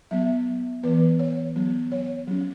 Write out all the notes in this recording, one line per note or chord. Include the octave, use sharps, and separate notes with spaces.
F#3 B3 E5
E3 B3 B4
C#5
F#3 B3
C#5
F#3 C#4